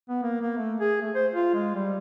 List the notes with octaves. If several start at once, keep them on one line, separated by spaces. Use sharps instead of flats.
B3
A#3
A#3
A3
G#4
A3
C5
F4
G#3
G3